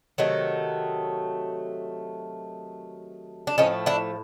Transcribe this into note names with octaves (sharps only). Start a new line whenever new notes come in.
C3 D#3 F#3 A3
D4
A2 F3 A3 C#4 D#4
D4 E4